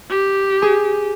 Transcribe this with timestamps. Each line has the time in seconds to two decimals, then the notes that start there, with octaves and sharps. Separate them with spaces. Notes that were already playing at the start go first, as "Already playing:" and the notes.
0.10 G4
0.62 G#4